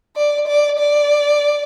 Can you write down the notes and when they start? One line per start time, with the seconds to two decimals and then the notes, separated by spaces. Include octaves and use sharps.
0.16 D5
0.47 D5
0.79 D5